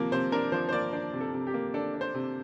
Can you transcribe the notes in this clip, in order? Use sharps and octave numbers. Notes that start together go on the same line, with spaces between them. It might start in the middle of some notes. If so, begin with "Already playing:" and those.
Already playing: C3 F3 A#3
C3 C5
D4 A#4
F3 C5
C5
A#3 D5
D4 C5
C3
A4
C3
G4
A#3
D4 A4
D4
C5
C3